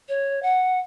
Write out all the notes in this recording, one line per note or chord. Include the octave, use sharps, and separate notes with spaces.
C#5
F#5